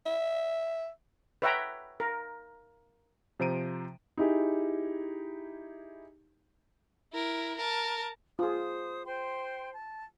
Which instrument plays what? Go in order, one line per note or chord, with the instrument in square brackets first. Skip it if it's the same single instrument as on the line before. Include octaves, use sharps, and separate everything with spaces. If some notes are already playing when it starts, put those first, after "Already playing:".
[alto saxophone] E5
[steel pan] B4 C#5 E5 F#5 G5 A#5
A#4
[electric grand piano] C3 F3 C5 A#5 D7 D#7
[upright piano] D#4 E4 G4 G#4
[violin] E4 A#4
A#4 A5
[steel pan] F4 G#4 [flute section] C5 D#6
[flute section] C5 G5 C6
A5